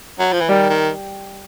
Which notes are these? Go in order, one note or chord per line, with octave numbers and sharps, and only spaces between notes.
F#3
F3
E3
D#3 G3
D#3